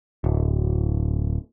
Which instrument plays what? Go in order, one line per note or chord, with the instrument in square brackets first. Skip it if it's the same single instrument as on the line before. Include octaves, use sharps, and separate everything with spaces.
[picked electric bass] D1